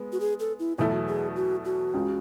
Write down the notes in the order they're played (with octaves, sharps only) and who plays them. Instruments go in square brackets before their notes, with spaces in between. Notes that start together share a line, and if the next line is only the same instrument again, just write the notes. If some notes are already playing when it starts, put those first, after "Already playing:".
Already playing: [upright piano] G#3 B3
[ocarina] F#4
G#4
A4
E4
[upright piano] E2 B2 F#3 A3 E4 [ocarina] F#4
[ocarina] G#4
F#4
F#4
[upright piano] C#2 C#3 G#3